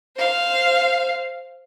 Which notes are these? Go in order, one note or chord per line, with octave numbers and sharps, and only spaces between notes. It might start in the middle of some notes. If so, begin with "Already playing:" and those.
C5 F5